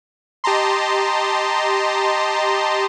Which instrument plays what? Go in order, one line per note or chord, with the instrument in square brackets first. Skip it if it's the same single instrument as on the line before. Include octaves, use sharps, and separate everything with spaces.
[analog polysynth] G4 D#5 A5 A#5 C6